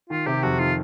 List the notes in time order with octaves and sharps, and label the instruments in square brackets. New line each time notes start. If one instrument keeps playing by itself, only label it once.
[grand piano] D#3 [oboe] F4
[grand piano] C3 [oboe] G4
[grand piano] F2 [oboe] F#4
[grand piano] D#3 [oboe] F4